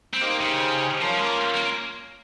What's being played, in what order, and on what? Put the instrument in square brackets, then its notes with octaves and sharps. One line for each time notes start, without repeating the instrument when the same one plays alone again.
[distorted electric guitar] C4
[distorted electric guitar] A#3 [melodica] D#4 G4 C5
[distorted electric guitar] C#3
[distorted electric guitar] F3 [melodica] C#4 F4 A#4
[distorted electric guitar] G#3
A#3
A#3